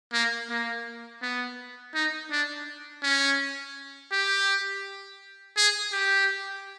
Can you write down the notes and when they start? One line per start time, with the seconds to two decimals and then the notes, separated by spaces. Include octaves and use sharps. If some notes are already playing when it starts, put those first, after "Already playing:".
0.13 A#3
0.50 A#3
1.22 B3
1.94 D#4
2.31 D4
3.03 C#4
4.12 G4
5.57 G#4
5.93 G4